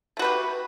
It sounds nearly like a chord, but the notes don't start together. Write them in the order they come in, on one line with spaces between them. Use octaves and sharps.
A3 F#4 B4 G4